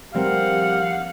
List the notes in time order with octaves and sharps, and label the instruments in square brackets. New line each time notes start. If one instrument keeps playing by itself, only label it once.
[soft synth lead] F3 [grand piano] G3 C4 A#4 [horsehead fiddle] G4 F#5 [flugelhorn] F5